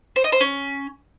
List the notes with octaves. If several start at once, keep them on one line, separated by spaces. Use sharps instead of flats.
C5
D#5
C5
C#4